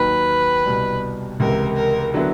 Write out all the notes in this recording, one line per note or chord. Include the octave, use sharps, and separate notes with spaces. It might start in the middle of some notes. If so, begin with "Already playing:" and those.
Already playing: D#2 D#3 F#3 B4
C2 B2 G3
C#2 C3 E3 A#4
A#4
D3 F#3 B3 E4